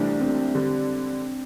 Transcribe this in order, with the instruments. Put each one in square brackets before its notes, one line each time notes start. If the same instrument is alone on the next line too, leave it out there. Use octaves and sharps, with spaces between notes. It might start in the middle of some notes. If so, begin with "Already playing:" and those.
Already playing: [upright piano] C2 C3 E3 A3 [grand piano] D4
[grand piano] C4
[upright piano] D3 G3